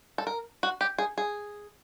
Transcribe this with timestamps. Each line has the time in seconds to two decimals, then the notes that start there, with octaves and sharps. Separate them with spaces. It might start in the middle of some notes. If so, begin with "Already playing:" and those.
0.18 A4
0.27 A#4
0.63 F#4
0.81 G4
0.98 G#4
1.18 G#4